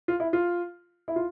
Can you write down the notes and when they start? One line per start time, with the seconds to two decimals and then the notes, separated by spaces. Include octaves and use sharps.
0.08 F4
0.20 E4
0.33 F4
1.08 E4
1.16 F4